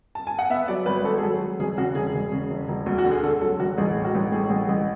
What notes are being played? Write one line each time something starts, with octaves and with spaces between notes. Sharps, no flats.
A5
G#5
F#5
B3 E5
F#3 D5
G#1 B4
G#1 A4
G#4
F#3 A4
F#3
E1 G#4
C#3 F#4
E1 G#4
E1
C#3
E1
E1
D2
F#4
D3
G#4
D3 A4
F#3 A4
E1 F#4
A1 G#4
A2
F#4
A1
A2 G#4
A1
A1